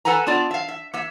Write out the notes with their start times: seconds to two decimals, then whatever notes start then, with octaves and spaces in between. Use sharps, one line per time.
0.05 A4 B4 F#5 G#5 A#5
0.27 B3 D4 F4 D5
0.51 E5 F5
0.68 E5
0.93 A#3 E5